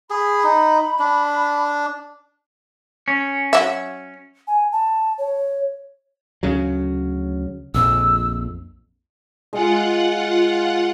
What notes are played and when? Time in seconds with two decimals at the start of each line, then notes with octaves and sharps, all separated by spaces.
0.10 G#4 B5
0.44 D#4
0.99 D4
3.08 C#4
3.53 F#3 E5
4.47 G#5
4.72 A5
5.18 C#5
6.43 D2 C#3 F#3
7.74 A#1 F2 E6
9.53 G#3 F4 F#5 G#5